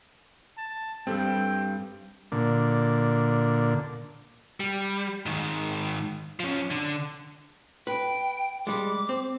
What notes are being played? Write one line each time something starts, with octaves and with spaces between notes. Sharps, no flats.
A5
G2 G3 C4 A4 G5
A#2 D3
G3
G#2 D#3
F3 C#4
D3
B4 G5
G3 G#3 D6
C4